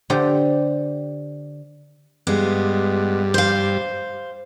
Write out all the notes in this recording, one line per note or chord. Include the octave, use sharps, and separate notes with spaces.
D3 G4 C5
G2 G#3 B3 F4
C5 F5